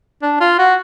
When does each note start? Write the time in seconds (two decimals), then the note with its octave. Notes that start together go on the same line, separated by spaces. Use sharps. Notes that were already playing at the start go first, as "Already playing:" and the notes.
0.22 D4
0.40 F4
0.59 F#4